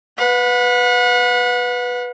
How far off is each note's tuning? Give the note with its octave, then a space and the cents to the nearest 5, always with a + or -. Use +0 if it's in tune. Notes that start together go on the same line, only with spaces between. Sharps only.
B4 +0 F#5 -40